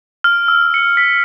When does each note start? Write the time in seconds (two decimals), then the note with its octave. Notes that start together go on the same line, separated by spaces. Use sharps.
0.24 F6
0.48 E6
0.74 C#7
0.97 B6